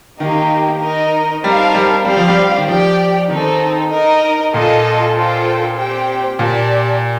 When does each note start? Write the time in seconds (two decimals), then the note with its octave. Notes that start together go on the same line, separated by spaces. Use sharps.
0.20 D#3 A#3 D#4 G4
0.81 D#4 A#4 D#5
1.44 G3 C4 D#4 A#4 F5 A5
1.75 G3
2.05 G3 C4 G4 D5 F5
2.17 F3
2.28 G3
2.58 D#3
2.67 F3 G4 D5 G5
3.30 D#3 C4 D#4 A4
3.92 D#4 A#4 D#5
4.54 A#2 F4 A4 D#5 A5
5.15 F4 A4 C5 G5
5.77 C4 G4 C5 G5
6.39 A#2 G4 D5 A5